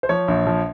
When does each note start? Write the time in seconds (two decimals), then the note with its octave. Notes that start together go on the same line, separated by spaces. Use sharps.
0.03 C5
0.09 F3 C#5
0.28 A#1
0.47 F3